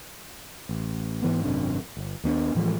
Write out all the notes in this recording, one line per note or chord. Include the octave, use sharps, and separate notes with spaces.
A1
G#2 E3 B3
G#1 F#2 C3 D4
G1
D#2 B3 C4 D4
A2 E3 F3 G#3